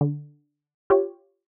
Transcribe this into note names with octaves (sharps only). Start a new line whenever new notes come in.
D3
F4 G4 C#5